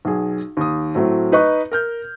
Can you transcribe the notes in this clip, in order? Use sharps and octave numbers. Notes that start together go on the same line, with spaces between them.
B1 G#4
D#2 D#6
A2 F#3 A3 C4
D#4 B4 D#5 C#6
A#4 F6 G6